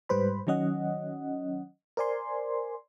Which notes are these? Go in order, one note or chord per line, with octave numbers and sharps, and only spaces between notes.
G#2 G3 B4 C5 B5
D#3 F#3 C#4 D#5 F#5
A#4 C5 D5 G#5 C6